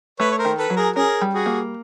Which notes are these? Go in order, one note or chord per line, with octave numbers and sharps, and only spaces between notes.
A3 B4 C#5
C#5
A#4 C5
D#3
A4 B4
F#3
G#4 A#4
C#4 G#4 A#4
G3
F#4 G#4
A#3